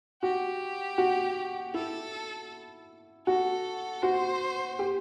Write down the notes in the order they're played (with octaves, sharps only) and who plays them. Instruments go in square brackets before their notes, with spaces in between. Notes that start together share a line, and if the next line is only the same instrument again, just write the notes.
[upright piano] F#4 [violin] G4
[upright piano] F#4
[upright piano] E4 [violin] A4
[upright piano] F#4 [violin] A4
[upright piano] F#4 [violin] C5
[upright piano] G4